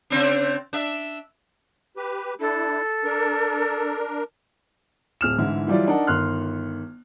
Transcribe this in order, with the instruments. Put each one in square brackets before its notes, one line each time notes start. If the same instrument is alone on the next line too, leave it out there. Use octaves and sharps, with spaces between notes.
[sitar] C#3 C4 D4
D4 E5
[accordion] G4 B4
[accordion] D4 E4 [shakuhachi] A4
[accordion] D4 A#4
[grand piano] D1 F6 E7
G#2 D3 E3 E4
E3 F#3 G3 E4 F4 D5
D4 D#4 A#4 D5 F#5 A5
G1 D#3 C6 F6 F#6